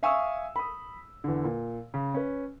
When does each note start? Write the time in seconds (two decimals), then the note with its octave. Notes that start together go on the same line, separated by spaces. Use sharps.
0.03 E5 F5 G#5 C#6 D#6 E6
0.56 B5 D#6
1.24 E2 D3
1.44 A#2
1.94 C#3
2.14 C#4 B4